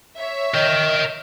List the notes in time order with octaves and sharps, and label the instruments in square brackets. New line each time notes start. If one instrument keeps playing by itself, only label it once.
[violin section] C#5 E5
[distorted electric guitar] A#4 G5 [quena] D#5